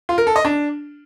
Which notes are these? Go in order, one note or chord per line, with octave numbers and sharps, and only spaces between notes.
F4
A#4
A4
D#5
D4